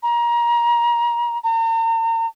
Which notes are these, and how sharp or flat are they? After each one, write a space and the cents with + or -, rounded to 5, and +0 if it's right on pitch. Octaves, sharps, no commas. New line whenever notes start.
A#5 +25
A#5 -40